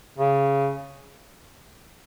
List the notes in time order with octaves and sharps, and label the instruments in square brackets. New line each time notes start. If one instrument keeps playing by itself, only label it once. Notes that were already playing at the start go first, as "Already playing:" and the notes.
[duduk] C#3